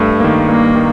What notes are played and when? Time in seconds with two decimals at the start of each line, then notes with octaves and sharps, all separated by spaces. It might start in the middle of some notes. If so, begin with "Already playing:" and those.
Already playing: G2 A3
0.20 D#3 A#3
0.49 G2 A#3
0.75 D#3